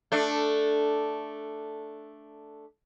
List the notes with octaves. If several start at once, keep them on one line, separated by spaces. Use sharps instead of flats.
A3 D4